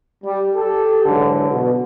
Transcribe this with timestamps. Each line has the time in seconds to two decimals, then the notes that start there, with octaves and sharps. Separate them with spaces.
0.24 G3
0.55 G4 A4
1.05 G#2 D3 E3 F#3
1.51 B2